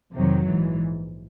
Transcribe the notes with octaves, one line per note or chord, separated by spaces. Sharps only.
F2 C3 D#3 F#3
A#1 G#2 E3